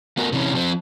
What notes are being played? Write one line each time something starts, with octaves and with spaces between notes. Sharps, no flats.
A3 B3 F#4 A#4
C3 E3 C#4
F3 C4